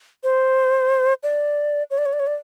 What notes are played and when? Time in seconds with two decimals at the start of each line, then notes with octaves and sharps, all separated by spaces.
0.24 C5
1.23 D5
1.91 C#5
1.98 D5
2.06 C#5
2.13 D5
2.20 C#5
2.27 D5